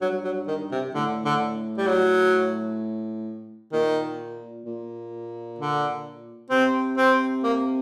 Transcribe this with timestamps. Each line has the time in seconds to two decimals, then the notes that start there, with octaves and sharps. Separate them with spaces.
0.01 G2 F#3
0.24 F#3
0.47 D#3
0.71 C3
0.94 A2 D3
1.25 D3
1.78 G3
1.87 F#3
3.73 A#2 D#3
4.65 A#2
5.59 D3
6.50 C3 C4
6.97 C4
7.44 A#3